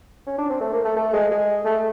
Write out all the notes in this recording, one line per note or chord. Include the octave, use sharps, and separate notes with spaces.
C#4
D4
C4
A3
A#3
A3
A3
G#3
G#3
A3